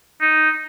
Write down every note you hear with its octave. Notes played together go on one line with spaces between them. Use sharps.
D#4